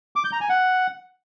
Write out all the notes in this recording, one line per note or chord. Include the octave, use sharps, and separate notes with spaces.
D6
G6
A#5
G#5
F#5